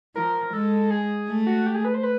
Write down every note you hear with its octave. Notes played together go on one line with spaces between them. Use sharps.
F3 A#4
G#3 A4
G#4
A3
F#4
G4
G#4
B4
C5
B4